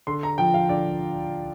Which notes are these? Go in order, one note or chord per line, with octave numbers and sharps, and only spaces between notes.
D3 C6
A#5
F3 G5
F5
D3 D5